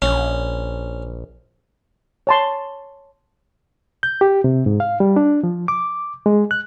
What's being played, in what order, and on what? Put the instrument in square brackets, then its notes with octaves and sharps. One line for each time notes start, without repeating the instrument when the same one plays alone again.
[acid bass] A#1 [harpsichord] C#4
[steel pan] C#5 A5 C6
[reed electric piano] G6
G4
C3
G#2
F5
G3
D4
F3
D6
G#3
F#6